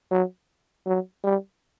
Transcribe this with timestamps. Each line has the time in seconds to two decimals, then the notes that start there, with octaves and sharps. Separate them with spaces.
0.12 F#3
0.87 F#3
1.24 G3